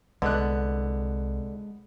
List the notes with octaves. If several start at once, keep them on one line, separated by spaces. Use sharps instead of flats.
C2 D3 G#3 B3 F#6